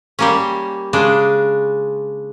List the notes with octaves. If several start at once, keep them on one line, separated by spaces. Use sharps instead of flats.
G3 A#3 C#4
C#3 G#3 D4